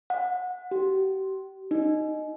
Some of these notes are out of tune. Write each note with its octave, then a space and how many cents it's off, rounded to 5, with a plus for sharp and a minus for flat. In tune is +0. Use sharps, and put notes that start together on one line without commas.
F#5 -25
G4 -40
D#4 -10